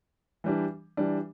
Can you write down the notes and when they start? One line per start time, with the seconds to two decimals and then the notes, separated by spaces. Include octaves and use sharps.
0.44 E3 G3 D4
0.97 E3 G3 D4